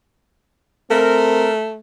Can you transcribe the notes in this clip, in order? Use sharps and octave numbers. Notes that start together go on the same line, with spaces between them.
A3 C4 A#4